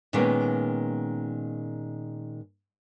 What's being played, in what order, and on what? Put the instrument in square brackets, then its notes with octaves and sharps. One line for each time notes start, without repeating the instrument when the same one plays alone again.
[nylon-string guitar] A#2 D#3 G#3 A#3 B3 C#4